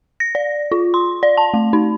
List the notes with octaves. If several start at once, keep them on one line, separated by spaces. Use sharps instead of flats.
A#6
D5
F4
C6
D5
A5
A3
D#4